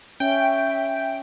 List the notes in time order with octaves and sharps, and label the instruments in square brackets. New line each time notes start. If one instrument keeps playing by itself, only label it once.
[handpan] C#4 [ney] E5 [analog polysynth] G5